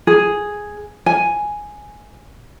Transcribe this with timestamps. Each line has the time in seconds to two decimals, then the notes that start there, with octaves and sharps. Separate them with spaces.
0.07 G#4
1.06 G#5